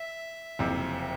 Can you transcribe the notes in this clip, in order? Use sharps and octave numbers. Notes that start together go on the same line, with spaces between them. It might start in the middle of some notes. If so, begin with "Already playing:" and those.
Already playing: E5
F#1 F2 C3